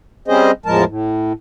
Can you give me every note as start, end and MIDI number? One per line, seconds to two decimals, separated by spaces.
0.28 0.51 55
0.28 0.51 60
0.28 0.51 61
0.28 0.51 68
0.28 0.51 72
0.28 0.51 75
0.66 0.84 40
0.66 0.84 45
0.66 0.84 53
0.66 0.84 56
0.66 0.84 70
0.66 0.84 81
0.87 1.33 45